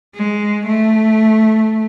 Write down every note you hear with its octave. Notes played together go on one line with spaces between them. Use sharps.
G#3
A3